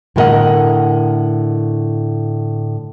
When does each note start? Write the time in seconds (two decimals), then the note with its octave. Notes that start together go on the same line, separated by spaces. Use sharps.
0.16 A2 D3 B3 A#4 D#5 F#5